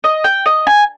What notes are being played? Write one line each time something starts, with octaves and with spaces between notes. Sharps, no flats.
D#5
G5
D#5
G#5